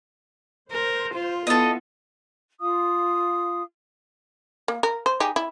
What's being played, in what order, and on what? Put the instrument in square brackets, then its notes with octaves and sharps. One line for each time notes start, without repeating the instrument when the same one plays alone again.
[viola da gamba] A#4 [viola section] C5
[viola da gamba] F4
[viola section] B3 E4 [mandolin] A4 D#5
[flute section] F4 F5 D#6
[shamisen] A#3
A#4
C5
D#4 G4 G#4
E4